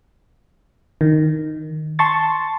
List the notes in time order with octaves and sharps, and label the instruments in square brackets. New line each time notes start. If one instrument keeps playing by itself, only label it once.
[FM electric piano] D#3
A5 C6 C#6 A6